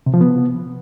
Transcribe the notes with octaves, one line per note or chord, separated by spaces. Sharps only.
C3
F3
B3